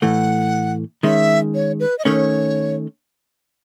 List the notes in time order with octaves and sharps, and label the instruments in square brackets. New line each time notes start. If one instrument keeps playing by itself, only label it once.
[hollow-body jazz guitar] A2 E3 A3 [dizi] F#5
[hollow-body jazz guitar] D#3 G#3 C#4 [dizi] E5
[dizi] C#5
B4
D#5
[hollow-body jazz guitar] D#3 A3 C#4 [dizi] C#5